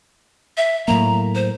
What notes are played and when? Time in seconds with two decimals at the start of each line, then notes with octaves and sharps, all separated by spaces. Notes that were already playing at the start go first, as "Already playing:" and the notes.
0.57 E5
0.88 A2 F#3 A#3 A#5
1.35 C5